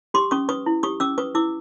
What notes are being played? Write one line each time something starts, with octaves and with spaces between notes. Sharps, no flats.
G4 C6 D6
C#4 C#6 D#6
B4 C#6 D#6
E4
G4 C#6 D#6
C#4 D6 E6
B4 C#6 D#6
E4 D6 E6